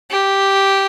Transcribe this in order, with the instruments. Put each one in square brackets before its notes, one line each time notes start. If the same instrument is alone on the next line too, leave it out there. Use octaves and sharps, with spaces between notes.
[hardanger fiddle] G4